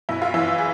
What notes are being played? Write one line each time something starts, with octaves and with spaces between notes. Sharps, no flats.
B1 B2 E4
F4
E3 E4
G#4